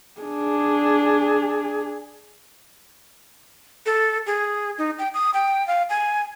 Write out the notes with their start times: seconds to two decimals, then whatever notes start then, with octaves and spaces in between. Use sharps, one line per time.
0.21 D4 G#4
3.86 A4
4.26 G#4
4.78 D#4
4.99 G5
5.14 D#6
5.34 G5
5.67 F5
5.90 G#5